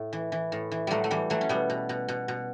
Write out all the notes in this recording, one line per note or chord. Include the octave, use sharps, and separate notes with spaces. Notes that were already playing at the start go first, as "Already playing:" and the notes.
Already playing: A2
E3
E3
A2
E3
A2 F#3 G3 A3
A3
E3 G3
E3 F#3 A3
C#4
B2 G3 B3
B2
B2
B2
B2